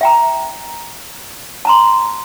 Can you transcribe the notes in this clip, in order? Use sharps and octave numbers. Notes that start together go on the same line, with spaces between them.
E5 G5 A#5
A5 A#5 C6